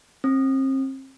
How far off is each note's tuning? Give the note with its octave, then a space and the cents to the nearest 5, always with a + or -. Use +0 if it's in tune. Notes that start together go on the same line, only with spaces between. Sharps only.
C4 +40